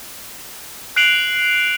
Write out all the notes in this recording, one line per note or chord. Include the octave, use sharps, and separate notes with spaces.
F#6 C7 D7 F7 F#7